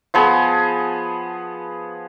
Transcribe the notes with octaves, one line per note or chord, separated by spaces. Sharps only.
F3 B3 G#4